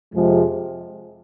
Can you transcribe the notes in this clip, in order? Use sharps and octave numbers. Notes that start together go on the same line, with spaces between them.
F2 C3 F3 G#3